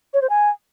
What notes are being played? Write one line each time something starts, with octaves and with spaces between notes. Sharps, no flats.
C#5
C5
G#5